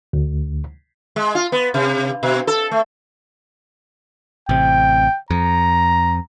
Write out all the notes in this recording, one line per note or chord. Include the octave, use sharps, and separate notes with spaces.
D2
G#3
F4
B3
C3
B2
A4
A3
A1 C3 G5
F2 A#5